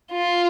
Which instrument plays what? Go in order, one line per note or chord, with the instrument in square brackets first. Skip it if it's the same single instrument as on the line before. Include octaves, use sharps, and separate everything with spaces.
[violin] F4